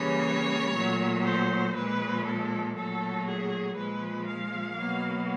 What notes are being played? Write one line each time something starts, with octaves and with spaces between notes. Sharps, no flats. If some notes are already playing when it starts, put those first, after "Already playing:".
Already playing: C#3 E3 G3 A#3 C#5
A#2 F#3 A3
C5
A#2 F3 G#3 B4
A4
A#2 F#3 A3 A4
G#4
A#2 F3 G#3 B4
F5
B2 F#3 A#3